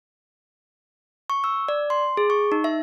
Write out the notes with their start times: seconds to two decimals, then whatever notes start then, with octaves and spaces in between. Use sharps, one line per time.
1.30 C#6
1.44 E6
1.68 D5
1.90 C6
2.17 G#4
2.30 C#6
2.52 D#4
2.64 E5